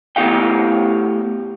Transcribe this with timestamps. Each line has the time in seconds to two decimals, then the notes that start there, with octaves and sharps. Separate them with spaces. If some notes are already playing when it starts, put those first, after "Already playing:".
0.16 A2 B3 C#4 G4 F5 G5